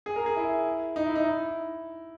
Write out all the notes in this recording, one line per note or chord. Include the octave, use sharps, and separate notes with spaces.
G#4
A#4
G#4
E4
D#4
E4
D#4
E4